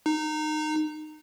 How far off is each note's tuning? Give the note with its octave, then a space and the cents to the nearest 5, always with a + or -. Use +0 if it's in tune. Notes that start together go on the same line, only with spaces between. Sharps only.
D#4 -20